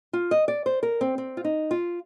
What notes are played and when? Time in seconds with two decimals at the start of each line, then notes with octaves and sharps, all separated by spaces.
0.13 F4
0.31 D#5
0.48 D5
0.66 C5
0.83 A#4
1.01 C4
1.18 C4
1.37 F4
1.44 D#4
1.71 F4